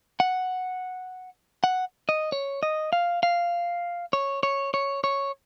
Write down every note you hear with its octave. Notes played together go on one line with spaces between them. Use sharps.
F#5
F#5
D#5
C#5
D#5
F5
F5
C#5
C#5
C#5
C#5